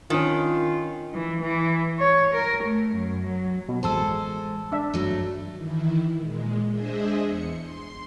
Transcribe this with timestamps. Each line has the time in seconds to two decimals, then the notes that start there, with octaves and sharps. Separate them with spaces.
0.10 D#3 C#4 D4 F4
1.14 E3
1.42 E3
1.99 C#5
2.34 A#4
2.64 A3
2.95 F#2
3.25 F#3
3.69 B2
3.83 A1 G#3 A4 C5 A5 E6
4.72 D4 E5
4.94 G2 F#3 A3
5.54 D#3 E3 E4
6.19 A#2 G#3
6.70 G#3 D4 G#4 C5 D#5 E5
7.24 E2 C#7
7.56 C6